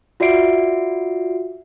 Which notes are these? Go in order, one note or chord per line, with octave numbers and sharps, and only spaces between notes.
F4 F#4 D5 E5 C7 D7